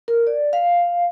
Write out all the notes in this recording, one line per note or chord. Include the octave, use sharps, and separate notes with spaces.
A#4
D5
F5